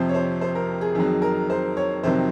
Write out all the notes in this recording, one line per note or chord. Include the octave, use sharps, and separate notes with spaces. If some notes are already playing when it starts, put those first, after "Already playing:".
Already playing: F2 C3 F3 C5
C#5
C5
C5
A#4
G#4
F2 D#3 F#3 G#4
A#4
C5
C#5
F2 C3 D#3 F#3 C5